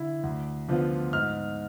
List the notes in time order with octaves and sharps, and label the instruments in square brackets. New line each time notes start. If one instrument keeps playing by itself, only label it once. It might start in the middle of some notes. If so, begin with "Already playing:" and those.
Already playing: [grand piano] D3 E4
D2
D3 F3 B3 F4
G#2 F6